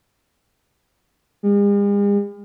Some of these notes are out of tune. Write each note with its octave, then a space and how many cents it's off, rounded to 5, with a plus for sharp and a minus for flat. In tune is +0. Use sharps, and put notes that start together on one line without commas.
G#3 -45